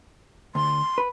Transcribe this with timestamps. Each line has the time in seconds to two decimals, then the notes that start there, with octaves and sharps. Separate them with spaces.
0.55 D2 C6
0.98 B4